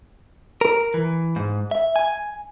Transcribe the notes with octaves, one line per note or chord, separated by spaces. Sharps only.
A#4
E3
G#2
E5
G#5